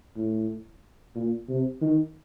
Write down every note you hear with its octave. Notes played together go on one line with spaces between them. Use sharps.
A2
A#2
C3
D#3